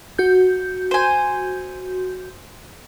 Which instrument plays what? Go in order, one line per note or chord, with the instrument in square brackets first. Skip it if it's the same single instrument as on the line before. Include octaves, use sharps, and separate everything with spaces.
[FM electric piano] F#4 G6
[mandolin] C5 G#5